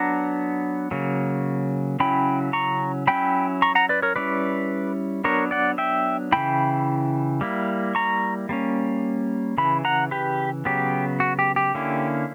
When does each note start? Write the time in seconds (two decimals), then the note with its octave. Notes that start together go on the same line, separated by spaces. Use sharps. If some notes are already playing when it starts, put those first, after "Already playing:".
Already playing: F#3 B3 D4 F#5 A#5
0.91 C#3 F#3 A#3
2.00 C#3 F#3 C#4 E4 G5 B5
2.53 A#5 C#6
3.07 F#3 C#4 E4 G5 B5
3.62 A#5 C#6
3.75 F#5 A#5
3.89 B4 D5
4.02 A#4 C#5
4.16 G3 C#4 E4 B4 D5
5.24 F#3 B3 D4 A#4 C#5
5.51 D5 F#5
5.78 E5 G5
6.32 C#3 E3 A#3 E4 G5 B5
7.41 G3 A#3 E4
7.95 A#5 C#6
8.49 G3 A#3 C#4
9.58 C#3 E3 B5
9.85 F#5 A#5
10.11 G4 B4
10.65 C#3 F#3 B3 G4
11.20 F#4
11.39 G4
11.56 G4
11.74 D3 A#3 C#4 E4